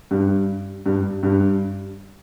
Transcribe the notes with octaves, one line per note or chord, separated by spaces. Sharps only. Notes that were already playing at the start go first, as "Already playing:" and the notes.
G2
G2
G2